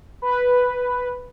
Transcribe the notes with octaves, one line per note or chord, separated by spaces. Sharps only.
B4